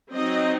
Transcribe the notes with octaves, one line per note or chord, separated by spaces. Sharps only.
F#3 C4 D#4 D#5